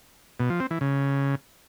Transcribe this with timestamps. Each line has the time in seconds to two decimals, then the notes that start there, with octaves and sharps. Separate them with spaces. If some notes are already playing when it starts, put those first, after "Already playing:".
0.40 B2
0.50 F3
0.60 C4
0.71 E3
0.81 C#3